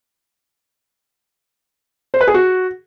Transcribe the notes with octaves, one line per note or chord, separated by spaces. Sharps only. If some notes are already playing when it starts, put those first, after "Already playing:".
C5
B4
G#4
F#4